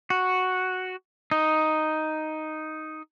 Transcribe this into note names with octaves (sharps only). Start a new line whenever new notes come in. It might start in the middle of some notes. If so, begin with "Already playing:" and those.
F#4
D#4